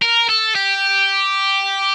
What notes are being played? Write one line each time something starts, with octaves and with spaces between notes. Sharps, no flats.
A#4
A4
G4